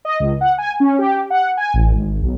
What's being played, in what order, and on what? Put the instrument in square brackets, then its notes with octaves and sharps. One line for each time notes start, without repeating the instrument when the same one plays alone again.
[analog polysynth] D#5
C#2
F#5
G#5
C#4
G4
F#5
G#5
A1
G#1
B1